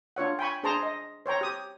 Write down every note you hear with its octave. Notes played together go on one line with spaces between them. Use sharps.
D4 F4 C#5 F#5
G5 G#5 B5 C#6
D4 G#4 C5 A5 A#5 C6
D#5
C5 C#5 G5 A#5
G4 D#6